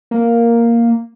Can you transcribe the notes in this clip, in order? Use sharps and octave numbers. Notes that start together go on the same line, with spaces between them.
A#3